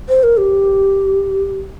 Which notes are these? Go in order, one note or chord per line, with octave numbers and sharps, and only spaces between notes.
C5
A#4
G4